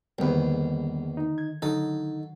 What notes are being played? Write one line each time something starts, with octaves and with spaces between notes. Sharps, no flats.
A#1 E2 D3 D#3 G3 B4
D#4
G#6
D3 F#3 D#4 A4